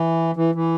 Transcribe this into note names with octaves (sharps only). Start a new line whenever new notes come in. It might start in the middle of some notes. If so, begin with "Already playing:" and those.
Already playing: E3
E3
E3